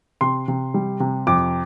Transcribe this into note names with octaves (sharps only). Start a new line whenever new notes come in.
C3 C6
C3
G3
C3
F2 D6